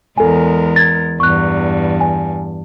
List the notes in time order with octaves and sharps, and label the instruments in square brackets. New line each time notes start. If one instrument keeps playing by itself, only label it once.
[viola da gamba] E2 G#3 A#4 [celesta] A4 G#5
[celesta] G#6 A6
[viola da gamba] E2 G2 [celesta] C#6 F#6
[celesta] G#5